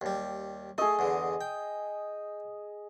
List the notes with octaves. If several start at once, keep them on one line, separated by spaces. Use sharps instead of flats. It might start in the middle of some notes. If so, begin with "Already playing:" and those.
D#2 G3
A3 G#4 D#5
E2 D3
G5